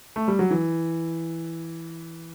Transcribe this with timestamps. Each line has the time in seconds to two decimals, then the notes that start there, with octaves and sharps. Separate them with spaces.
0.16 A3
0.28 G3
0.39 F#3
0.51 E3